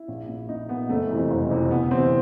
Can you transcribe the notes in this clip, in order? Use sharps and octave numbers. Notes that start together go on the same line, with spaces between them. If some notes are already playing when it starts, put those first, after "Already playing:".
Already playing: E4
A#1
A#2
A#1 D#4
A#2 B3
F#1 A3
F2 C3 E3
F#1
F2 C3 E3
D2 B3
C3 E3 C4